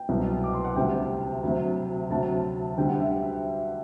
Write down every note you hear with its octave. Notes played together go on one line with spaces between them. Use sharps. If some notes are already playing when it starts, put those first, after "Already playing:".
Already playing: G5
C2 B2 F#3
D6
C6
F#5
D2 C3 G3 G5
D2 C3 F#3
D2 C3 F#3 A5
D2 D3 G3 G5
F#5
E5